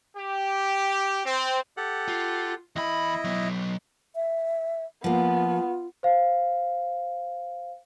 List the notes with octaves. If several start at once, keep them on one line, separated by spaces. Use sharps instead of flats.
G4
C4
G4 A4 F#5
F4
E2 E4 D#5 B5
F#3 B3
E5
F3 A#3 B3 F4
C5 F5